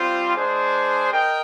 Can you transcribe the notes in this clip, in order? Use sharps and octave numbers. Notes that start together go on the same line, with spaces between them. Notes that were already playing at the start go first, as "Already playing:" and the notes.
Already playing: G3 C4 F4 C5
G#3 D4 G#4 C5
A#4 D#5 G5